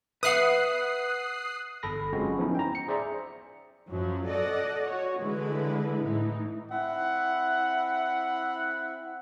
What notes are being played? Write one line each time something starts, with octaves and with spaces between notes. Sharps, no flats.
B4 E5 F#5 D#6 F#6 C7
G1 A4 B5 A#6
F#3 G#3 C4 C#4 F4 F#4
F3 B3 C#4 D#4 E4
G5 A#5
C#7
G#4 C5 D5 E5 A#5
F#2 F3 F#3
A4 D5 D#5 F#5
F#4 C#5
D3 E3 G#3 E4 B4
A2 E3 D#4
C4 E4 E5 F#5